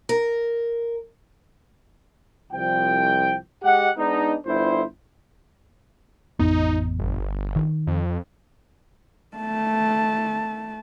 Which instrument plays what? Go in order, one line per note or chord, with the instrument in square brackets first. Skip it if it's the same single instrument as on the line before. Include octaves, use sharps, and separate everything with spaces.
[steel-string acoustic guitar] A#4
[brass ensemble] C2 F3 G5
G#3 G4 D#5 F#5
G#3 B3 D4 D#4
G1 E4 C5
[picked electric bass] A1 F2 B3 [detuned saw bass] D#4
[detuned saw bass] G1
[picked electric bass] D#3
[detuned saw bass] F2
[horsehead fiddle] A3 A5